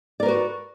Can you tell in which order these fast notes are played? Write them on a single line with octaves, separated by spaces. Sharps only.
D5 A#4 B4 F#4